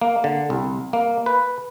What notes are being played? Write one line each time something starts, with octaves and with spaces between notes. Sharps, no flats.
A#3
D3
C2
A#3
B4